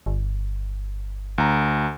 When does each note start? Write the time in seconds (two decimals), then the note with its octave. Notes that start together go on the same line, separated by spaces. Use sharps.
0.06 G1
1.38 D2 A#5